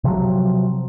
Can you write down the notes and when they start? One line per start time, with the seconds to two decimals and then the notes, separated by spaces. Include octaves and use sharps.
0.04 C3 F3 F#3